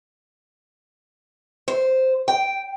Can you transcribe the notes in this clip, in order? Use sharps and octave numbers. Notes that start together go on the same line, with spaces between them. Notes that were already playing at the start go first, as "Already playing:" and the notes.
C5
G5